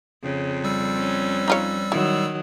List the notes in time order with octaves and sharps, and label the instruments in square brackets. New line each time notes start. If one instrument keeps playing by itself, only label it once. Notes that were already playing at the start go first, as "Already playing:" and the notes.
[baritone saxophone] F2 [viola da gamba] C#3
[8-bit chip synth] G3 E6
[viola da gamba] C#4
[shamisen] D#4 F4 C#5
[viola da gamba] D#3 F#3 [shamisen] E4